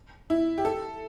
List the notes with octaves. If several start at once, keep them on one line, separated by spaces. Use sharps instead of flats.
E4
G4
A4